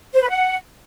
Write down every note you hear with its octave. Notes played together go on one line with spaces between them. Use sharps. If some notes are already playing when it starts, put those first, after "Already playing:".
C5
B4
F#5